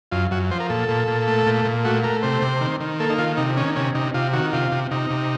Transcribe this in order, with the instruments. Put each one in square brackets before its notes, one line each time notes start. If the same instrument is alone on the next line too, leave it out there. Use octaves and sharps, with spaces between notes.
[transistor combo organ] F#2 F4
F#2 F#4
F3 C5
A#4
A#2 A4
A#2
A#2
A3
A#2
A#2
A3 F#4
A3 A#4
C3 C5
C3
D#3
D#3
A#3 A4
D#4
D#3 F4
C3 D#4
D#3 C#4
C3 C#4
C3 D#4
C3 F4
D#3 F#4
C3 F4
C3
C3 D#4
C3